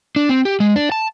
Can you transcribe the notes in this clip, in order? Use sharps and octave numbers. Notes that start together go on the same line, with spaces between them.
D4
C4
G4
G#3
D4
A5